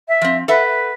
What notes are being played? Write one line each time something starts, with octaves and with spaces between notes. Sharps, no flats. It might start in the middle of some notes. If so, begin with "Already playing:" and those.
E5
F3 C4
A4 B4 E5 F#5